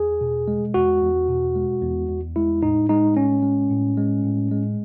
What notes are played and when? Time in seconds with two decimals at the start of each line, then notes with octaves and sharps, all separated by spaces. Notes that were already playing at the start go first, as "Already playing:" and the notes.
Already playing: E2 G#4
0.21 B2
0.48 G#3
0.74 E2 F#4
1.02 E2
1.28 B2
1.55 G#3
1.82 E2
2.09 E2
2.36 G#3 E4
2.62 A2 D#4
2.89 G#3 D#4
3.17 A2 C#4
3.43 G#3
3.71 A2
3.97 G#3
4.24 A2
4.51 G#3